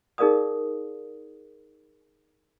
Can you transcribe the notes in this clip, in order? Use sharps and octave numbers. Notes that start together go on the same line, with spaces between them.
D#4 G#4 A#4 D5 F5 D#6